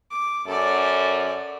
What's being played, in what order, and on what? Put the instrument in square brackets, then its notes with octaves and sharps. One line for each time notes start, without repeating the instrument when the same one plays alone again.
[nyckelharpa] D6
[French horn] F#2 [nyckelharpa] A4 D5